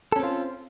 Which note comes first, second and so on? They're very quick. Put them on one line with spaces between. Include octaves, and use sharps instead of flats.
A4 C#4 C4 F4